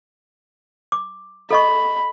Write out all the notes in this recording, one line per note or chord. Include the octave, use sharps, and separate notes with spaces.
D6
A4 D#5 B5 C#6